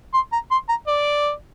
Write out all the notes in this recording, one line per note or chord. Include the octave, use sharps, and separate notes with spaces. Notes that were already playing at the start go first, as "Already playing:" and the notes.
C6
A#5
C6
A#5
D5